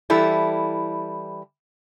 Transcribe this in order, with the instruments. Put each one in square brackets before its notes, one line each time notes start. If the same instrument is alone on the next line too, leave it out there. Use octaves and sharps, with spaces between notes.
[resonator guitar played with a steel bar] E3 G3 E4 A4